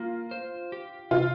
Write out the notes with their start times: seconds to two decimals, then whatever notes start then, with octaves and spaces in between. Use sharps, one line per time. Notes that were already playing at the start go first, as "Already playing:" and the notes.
Already playing: A#3 F4
0.31 C5
0.72 G4
1.11 C3 F4